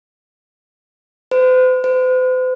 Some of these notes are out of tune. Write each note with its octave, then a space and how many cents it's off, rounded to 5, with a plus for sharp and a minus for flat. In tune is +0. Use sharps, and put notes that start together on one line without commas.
C5 -45
C5 -45